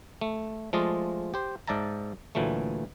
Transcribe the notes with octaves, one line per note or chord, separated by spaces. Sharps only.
A3
F3 G#3 A3 F4 D5 D#5
G4 C5
G#2 D5 E5 A5 A#5
D2 A#2 E3 F#3 A3